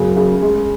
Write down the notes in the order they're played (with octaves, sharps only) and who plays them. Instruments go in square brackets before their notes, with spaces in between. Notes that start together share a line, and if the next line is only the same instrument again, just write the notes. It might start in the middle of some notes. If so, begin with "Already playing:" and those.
Already playing: [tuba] F#2 [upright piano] C#3 B3
[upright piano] C#3
G#3